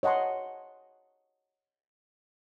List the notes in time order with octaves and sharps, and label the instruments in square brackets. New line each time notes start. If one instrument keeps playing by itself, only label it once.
[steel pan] C#5 D#5 F#5 A5 C6